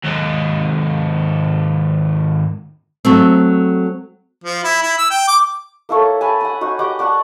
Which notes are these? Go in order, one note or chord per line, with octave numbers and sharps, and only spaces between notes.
D#2 G#2
F#3 A3 C4
F3
E4
E4
E6
G5
D6
A#3 E4 A4 C#5
G#5 A5 B5
F#5 G#5
D#4 F#4
G4 D#5 F#5 D6
D5 F#5 A5 C#6